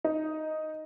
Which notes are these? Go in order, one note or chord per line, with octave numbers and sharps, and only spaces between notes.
D#4